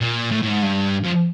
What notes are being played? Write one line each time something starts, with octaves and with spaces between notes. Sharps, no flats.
A#2
A2
A2
G#2
G2
F2